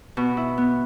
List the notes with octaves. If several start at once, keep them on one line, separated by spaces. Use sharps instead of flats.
B2
E4
B3